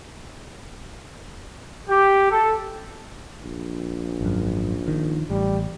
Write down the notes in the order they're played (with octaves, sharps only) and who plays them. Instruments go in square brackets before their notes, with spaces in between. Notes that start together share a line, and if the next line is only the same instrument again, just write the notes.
[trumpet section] G4
A4
[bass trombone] A#1
[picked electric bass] G#1 F#2
D#3
[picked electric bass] A1 [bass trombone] G3